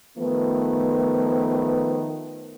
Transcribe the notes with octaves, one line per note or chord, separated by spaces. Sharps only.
D#3 F3 A3 B3